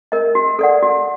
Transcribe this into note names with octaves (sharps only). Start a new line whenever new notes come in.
A#4 D#5
F#4
A4 D5 F#5
F#4